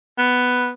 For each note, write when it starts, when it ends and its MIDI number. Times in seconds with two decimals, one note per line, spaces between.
0.18 0.69 59